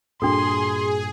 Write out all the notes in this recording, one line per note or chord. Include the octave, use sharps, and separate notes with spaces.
G2 A#2 D4 F#4 G#4 A4 C6